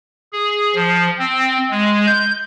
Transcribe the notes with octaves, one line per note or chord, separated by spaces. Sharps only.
G#4
F3
C4
G#3
G6